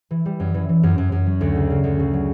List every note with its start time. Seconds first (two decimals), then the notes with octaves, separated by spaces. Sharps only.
0.11 E3
0.26 G3
0.40 F#2
0.54 E3
0.69 E3
0.83 F#2
0.98 F#2
1.12 F#2
1.27 F#3
1.41 D2
1.55 C#3
1.70 C#3
1.84 D2
1.99 C#3
2.13 F#3